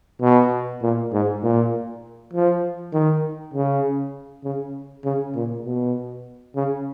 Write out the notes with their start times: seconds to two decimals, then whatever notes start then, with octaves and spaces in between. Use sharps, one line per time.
0.22 B2
0.82 A#2
1.12 G#2
1.43 A#2
2.33 F3
2.93 D#3
3.54 C#3
4.44 C#3
5.04 C#3
5.35 A#2
5.65 B2
6.56 C#3